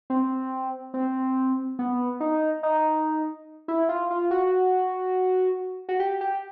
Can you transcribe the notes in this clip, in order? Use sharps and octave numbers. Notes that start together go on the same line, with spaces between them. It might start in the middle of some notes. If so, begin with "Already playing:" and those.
C4
C4
B3
D#4
D#4
E4
F4
F4
F#4
F#4
G4
G4